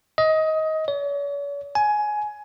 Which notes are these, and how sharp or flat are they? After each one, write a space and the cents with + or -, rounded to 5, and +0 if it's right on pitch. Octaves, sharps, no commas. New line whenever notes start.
D#5 +20
C#5 +45
G#5 +15